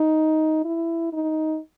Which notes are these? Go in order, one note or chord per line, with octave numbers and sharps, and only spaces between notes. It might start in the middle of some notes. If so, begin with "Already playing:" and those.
Already playing: D#4
E4
D#4